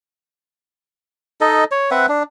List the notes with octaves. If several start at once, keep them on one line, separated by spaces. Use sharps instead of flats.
D#4 A4 D#5
C#5
C4 B4 E5 F#5
D4